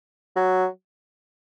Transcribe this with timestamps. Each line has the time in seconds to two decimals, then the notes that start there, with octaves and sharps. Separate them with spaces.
0.36 F#3